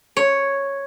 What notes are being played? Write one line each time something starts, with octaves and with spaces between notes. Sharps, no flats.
C#5